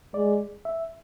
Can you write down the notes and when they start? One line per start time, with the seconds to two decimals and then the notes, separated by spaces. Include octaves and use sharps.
0.14 G#3 D5
0.65 E5